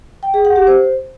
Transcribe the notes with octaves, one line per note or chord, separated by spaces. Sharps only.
G5
G#4
F#5
G4
C5